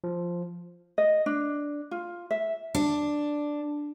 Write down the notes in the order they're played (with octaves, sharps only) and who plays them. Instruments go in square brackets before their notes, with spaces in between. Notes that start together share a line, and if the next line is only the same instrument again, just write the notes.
[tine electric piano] F3
[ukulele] D#5
D4
F4
E5
[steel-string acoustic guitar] D4